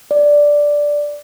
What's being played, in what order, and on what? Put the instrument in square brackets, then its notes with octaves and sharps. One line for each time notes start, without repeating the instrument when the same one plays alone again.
[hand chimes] D5